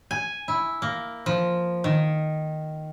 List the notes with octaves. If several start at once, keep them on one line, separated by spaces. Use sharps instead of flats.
G#5
E4
A#3
F3
D#3